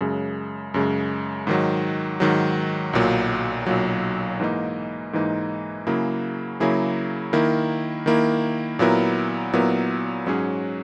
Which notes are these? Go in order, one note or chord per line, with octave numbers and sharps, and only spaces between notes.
F#2 C#3 G#3
F#2 C#3 G#3
G#2 D#3 F#3
G#2 D#3 F#3
B1 A#2 F#3
B1 A#2 F#3
G#2 E3 A#3 D#4
G#2 E3 A#3 D#4
C#3 F#3 A#3 E4 G#4
C#3 F#3 A#3 E4 G#4
D#3 A#3 E4
D#3 A#3 E4
A#2 F#3 B3 E4 A#4
A#2 F#3 B3 E4 A#4
G#2 F#3 C#4 G#4